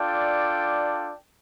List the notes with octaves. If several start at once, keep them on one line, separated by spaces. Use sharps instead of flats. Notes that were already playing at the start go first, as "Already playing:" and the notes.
Already playing: D4 F4 A4 D5 G5